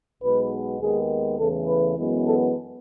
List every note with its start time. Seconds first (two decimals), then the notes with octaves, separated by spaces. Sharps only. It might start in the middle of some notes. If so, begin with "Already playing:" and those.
0.22 B1 B2 G#3 B3 B4
0.80 D#2 D#3 G#3 B3 G#4
1.39 E2 C#3 E3 A3 A4
1.68 B4
1.96 F#2 E3 G#3 B3
2.25 A4